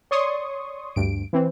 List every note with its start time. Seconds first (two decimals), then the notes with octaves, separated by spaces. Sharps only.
0.11 C#5 D5 C6 C#6 D#6
0.96 D2 G2 D7
1.33 E3 C4